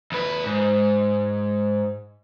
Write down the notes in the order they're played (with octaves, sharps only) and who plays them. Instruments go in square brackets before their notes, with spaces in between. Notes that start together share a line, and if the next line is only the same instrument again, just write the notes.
[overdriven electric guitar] D#2 B4
G#2